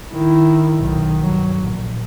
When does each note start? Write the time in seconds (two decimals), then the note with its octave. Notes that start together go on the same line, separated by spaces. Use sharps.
0.13 D#3 E4
0.79 B1 D#3
1.21 G2 F#3
1.57 A#1